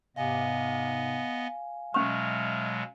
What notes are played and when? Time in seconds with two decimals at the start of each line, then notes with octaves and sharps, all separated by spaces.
0.16 G#2 C3 B3 D#5 F5 G#5
1.94 B2 F#3 G#3 C#4 E5 C#6 F6